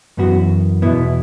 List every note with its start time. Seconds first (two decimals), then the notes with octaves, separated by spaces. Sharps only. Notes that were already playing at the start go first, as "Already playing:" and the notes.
0.17 F#2 E3 B3 F#4
0.82 E2 B2 B3 E4